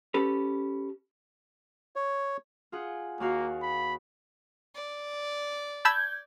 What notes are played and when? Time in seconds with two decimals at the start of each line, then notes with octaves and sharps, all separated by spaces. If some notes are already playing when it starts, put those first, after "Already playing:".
0.14 C#4 G4 A4 B4
1.96 C#5
2.72 F4 G#4 F#5
3.20 D#2 A#3 F#4 F5
3.62 B5
4.75 D5
5.85 A5 B5 E6 G6 G#6